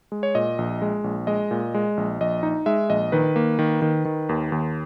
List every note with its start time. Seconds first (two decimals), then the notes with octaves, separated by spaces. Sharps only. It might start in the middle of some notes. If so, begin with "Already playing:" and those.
0.12 G#3
0.23 C#5
0.35 A#2 D#5
0.58 A#1
0.82 G#3
1.04 A#1
1.27 G#3 D#5
1.51 A#2
1.74 G#3
1.97 A#1
2.20 A#1 D#5
2.43 D#4
2.66 G#3 E5
2.89 A#1 D#5
3.12 D#3 B4
3.36 A#3
3.59 D#3
3.82 D#3
4.05 D#3
4.29 D#2
4.52 D#2